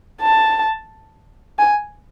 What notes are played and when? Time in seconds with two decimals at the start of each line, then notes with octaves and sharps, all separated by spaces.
0.22 A5
1.59 G#5